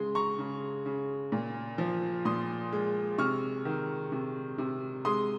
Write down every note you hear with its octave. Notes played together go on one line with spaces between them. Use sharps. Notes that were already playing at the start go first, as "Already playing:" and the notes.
Already playing: C#3 G#3 C6
A#5 C#6
C#3
C#3
A#2
F3
A#2 C6 D#6
G#3
C3 C#6 F6
D#3
C3
C3
G#3 C6 D#6